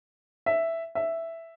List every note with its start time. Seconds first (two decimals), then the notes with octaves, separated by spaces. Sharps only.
0.46 E5
0.95 E5